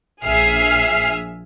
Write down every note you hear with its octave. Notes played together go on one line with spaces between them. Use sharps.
A#1 G#4 E5 F6 C7